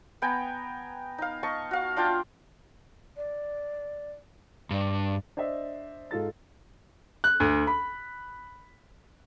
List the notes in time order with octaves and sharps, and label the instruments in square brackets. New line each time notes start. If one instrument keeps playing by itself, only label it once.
[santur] B3 G5 G#5 A#5
D#4 F5
D#5 A5 C#6
F#4 F5
D4 F4 G5 A5
[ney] D5
[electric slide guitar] G2 [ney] D4
[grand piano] D4 C5 D#5 E5
G#2 F4 A4 A6
[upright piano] F#6
D2
B5